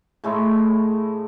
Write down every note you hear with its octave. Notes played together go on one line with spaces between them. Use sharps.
A2 G#3 A3 E4